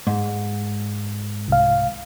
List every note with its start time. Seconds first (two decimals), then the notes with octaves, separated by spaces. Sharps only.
0.07 G#2
1.48 C2 F5